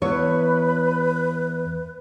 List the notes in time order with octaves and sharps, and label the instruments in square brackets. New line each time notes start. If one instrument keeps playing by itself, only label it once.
[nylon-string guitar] E2 C#5 [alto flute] B4